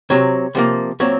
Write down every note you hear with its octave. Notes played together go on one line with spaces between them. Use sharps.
C3 F#3 C4 C#5
C3 F3 A#3
A#2 F#3 C4 C#5